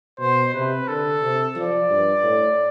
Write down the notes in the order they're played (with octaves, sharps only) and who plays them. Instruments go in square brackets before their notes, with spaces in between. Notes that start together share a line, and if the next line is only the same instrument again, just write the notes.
[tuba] B2 [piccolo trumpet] C5
[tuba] C3 [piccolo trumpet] B4
[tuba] D3 [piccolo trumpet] A4
[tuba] C3
[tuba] F3 [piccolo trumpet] D5
[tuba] G2
A2